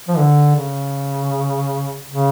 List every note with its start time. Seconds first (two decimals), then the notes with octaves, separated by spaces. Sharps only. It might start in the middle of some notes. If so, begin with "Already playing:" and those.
0.08 F3
0.17 D3
0.56 C#3
2.10 C#3